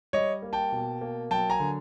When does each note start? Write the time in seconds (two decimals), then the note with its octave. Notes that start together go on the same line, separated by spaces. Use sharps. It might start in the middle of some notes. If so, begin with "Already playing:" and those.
0.13 G3 C#5 D#5
0.42 A#3
0.53 G5 A5
0.72 B2
1.01 A#3
1.30 F#3 G5 A5
1.50 G#5 A#5
1.60 D3